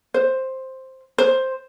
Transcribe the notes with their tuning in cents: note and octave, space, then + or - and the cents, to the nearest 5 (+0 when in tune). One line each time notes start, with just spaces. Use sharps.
C5 +5
C5 +5